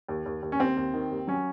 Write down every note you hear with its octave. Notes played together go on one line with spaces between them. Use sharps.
D#2
D#2
D#2
C#4
D#2 C4
D#2
D#3
D#2
F#3 C#4